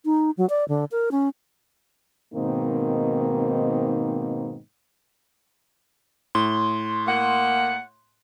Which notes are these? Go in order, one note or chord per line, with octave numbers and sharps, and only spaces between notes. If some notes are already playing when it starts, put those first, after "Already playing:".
D#4
F#3
D5
D3
A#4
C#4
G#2 B2 D#3 A#3 C4 D#4
A2 C6
A#3 F#5